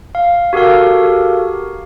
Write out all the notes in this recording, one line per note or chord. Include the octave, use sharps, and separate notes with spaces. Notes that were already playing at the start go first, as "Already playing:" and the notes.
F5
F#4 G4 A4 A#4 F5